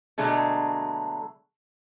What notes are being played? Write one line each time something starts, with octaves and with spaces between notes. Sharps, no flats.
B2 D3 F#3 G#3 A3